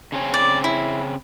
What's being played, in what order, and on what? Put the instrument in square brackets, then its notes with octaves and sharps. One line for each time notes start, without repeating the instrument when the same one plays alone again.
[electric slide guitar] C#3 C4 C#4
[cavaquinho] D5
E4